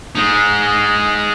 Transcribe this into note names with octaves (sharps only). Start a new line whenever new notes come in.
G#3 D#4